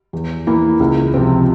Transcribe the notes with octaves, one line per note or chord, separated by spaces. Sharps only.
E2
E3 A#3 E4
C#2
C3 F3 C4